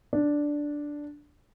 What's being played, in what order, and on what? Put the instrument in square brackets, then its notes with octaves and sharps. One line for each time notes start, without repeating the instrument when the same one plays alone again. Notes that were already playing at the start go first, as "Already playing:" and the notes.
[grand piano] D4